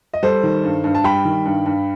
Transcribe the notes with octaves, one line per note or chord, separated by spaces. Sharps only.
D#5
G3 A4 C5
D#3
G2
G2
A5
G3 G5 B5
D#3
G2
G2